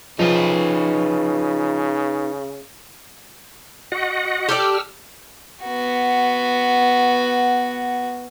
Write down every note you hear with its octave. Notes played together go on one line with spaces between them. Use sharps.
C#3 F3 D#4 B4
F#4 D#5 F#5
G4 A4 D5 E6 F6
B3 F#4